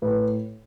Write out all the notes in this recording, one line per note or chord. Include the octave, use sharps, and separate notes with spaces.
A2 B4